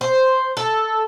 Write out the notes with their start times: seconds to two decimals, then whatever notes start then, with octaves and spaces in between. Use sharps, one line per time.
0.01 C5
0.57 A4